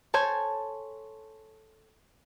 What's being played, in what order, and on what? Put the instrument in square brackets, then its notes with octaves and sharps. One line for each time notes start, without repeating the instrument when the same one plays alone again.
[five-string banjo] A4 C5 C#5 G#5